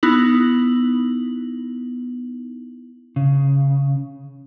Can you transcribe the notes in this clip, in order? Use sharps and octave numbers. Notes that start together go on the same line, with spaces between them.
B3 D#4 E4 F#7
C#3